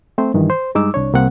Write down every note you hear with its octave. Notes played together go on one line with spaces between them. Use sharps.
A3 C4 C5
G2 D#3 E3
C5
G2 G3 G#3 D#4 D6 E6
C2 D4 C#5
C2 A#3 C4 F#5